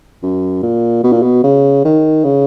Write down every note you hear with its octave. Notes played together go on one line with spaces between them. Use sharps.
F#2
A#2
B2
A#2
B2
C#3
D#3
C#3